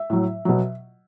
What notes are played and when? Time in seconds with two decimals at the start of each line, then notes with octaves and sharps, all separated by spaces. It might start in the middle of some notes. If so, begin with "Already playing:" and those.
Already playing: E5
0.10 A2 F#3
0.45 B2 F#3